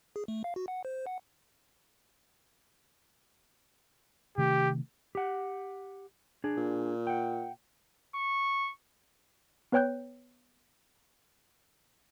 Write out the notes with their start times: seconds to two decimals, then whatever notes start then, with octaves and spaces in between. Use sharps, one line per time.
0.16 G#4
0.28 A3
0.44 F5
0.56 F#4
0.68 F#5
0.85 C5
1.07 F#5
4.38 C3 D#3 A3 G4
5.15 G4 F#5
6.44 D4 G#4
6.57 A#2
7.07 F#5 G5
8.15 C#6
9.72 B3 B4 C#5 G5 F#6 G6